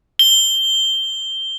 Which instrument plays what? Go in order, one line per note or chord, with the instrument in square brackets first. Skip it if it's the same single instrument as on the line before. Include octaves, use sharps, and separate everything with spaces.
[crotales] G7